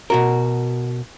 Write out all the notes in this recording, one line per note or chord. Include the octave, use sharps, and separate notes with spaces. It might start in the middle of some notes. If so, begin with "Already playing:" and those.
B2 F#4 A#4